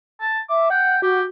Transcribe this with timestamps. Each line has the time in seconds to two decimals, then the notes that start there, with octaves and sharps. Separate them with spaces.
0.20 A5
0.49 E5 D6
0.70 F#5 G5
1.02 F#4 G4